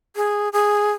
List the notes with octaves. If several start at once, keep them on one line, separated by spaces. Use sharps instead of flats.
G#4
G#4